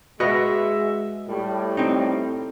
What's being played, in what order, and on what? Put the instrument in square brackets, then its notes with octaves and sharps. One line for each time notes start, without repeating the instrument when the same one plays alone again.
[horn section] G#3 E5 [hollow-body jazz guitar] F#4 B4 D#5
[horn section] A2 G3
[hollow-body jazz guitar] C4 D#4